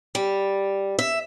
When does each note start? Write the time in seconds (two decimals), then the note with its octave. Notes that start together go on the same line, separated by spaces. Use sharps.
0.15 G3
0.99 E5